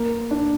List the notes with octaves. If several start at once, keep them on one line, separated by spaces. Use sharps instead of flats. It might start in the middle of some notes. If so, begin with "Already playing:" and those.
Already playing: A#3
D4